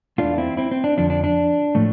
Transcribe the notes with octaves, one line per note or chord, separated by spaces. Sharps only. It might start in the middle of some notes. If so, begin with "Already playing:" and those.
E2 E3 A3 D4 F4
C4 E4
C4 E4
C4
D4
F2 D3 F3 D4
D4
D4
A2 F3 A3